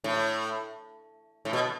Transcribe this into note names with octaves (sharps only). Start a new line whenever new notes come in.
A2
A2
B2